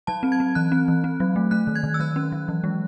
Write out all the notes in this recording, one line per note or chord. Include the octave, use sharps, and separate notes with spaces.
F#3 A5
C4
G#6
C4
E3 F#6
C4
E3
C4
F#3
A3
A3 F#6
D#3
G#6
D#3
E6
F#3 F#6
C#4
F#3
E3
G#3